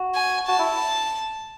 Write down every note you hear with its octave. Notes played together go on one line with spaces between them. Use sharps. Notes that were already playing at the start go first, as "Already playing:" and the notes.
Already playing: F#4
G#5
F#4 A5
E4